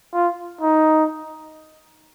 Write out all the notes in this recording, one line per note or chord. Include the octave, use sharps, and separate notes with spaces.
F4
D#4